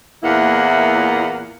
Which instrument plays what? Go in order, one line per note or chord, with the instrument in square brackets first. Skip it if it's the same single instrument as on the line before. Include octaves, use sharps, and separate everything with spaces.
[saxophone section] E2 A#2 A#3 E4 F#5